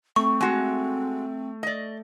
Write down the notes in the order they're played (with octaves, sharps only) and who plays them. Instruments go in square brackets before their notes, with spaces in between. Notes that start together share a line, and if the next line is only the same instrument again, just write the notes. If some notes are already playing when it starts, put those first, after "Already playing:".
[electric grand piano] A3 [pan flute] C4 [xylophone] C#6
[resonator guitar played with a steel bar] G#3 F#4
D5 D#5